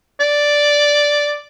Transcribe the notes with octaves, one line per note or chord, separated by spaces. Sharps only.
D5